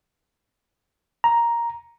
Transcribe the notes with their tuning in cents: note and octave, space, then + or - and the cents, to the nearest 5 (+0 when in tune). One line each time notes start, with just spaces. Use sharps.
A#5 +5